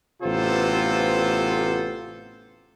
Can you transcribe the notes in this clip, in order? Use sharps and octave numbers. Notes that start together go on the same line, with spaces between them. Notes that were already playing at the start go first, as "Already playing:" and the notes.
A1 C3 B3 F4 A4 C5